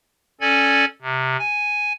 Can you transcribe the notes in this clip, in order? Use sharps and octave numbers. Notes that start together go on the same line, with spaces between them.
C#4 A4 D5 G#5 G#6
C3
G#5